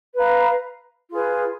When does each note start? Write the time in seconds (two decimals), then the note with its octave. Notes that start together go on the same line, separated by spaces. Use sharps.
0.16 B4 F5 A#5
1.10 F4 G#4 B4